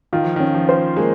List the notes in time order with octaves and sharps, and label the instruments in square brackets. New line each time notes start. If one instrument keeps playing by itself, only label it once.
[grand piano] D#3 [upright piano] F4
[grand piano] F3
[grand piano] D#3 [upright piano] C#4
[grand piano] F3
[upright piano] C5
[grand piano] G#3 [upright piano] A#3